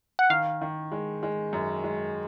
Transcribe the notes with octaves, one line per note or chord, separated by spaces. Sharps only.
F#5
D#3 F5
D#3
G#3
G#3
F#2
G#3